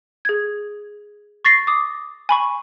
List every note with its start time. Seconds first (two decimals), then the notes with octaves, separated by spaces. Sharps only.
0.25 G#4 G#6
1.45 C#6 A6 A#6 C7
1.67 D6 D#6
2.29 G#5 B5 C#6